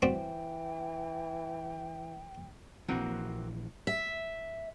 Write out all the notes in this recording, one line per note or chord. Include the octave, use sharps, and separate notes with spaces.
E3 G3 C4 F#4 G5
A#1 E3 A#3 C4 F#4
E5